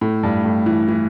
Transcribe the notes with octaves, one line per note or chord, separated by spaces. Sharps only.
A2
G2
A2
E3
E3